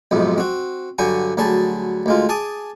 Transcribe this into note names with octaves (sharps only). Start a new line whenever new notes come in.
B1 F2 G#2 C3
C4 F#4
G2 D3 F#3 G5 G#5 C#6
D2 F#3 G3 G#4 A5
D2 G#3 F4
G#4 A5 D6 D#6